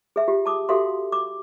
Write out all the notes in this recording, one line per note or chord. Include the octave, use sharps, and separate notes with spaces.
G#4 E5
F4 G4
A5 D6 D#6
F#4 G4 A4 E5 F5 C6
D6